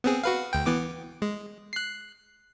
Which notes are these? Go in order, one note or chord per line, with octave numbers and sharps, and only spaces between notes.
B3 C4 G#4
F#4 B4 F5
D2 G5
E3 B3 D6
G#3
F#6 C7